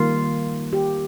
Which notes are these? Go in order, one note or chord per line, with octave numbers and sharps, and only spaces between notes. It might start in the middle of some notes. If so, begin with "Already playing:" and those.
Already playing: D#3 G3 A#3 F4
G4